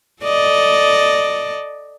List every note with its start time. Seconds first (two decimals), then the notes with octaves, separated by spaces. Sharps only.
0.23 A4 D5 D#5